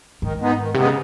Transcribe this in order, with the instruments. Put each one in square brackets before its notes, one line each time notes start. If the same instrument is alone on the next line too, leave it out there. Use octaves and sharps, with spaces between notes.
[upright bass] G#2 [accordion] D#3
[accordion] G#3 B3 D#4
D#3
[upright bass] C3 [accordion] G#3 B3 D#4
[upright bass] C#3